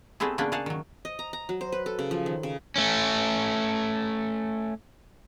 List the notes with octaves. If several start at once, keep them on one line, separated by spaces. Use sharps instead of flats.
G3 A3 B3 C4 E4 G#4
C#3 A#3 B3 C#4 D4 D5
A#3 G#4 F5 F#5 A5
D#3 F#3
D#5
A#5
A#5
F#3
C5
B4
A4
C#3
F3
D#3
C#3
A3 C#4